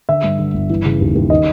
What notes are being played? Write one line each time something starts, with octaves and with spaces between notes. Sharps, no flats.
D3 E5
G2
D3
G1
E3
C#3
D#2
D#2
D#3 D#5